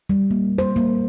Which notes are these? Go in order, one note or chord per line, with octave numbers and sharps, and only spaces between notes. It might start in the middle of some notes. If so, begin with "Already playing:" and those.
G3
A#3
C5
A#3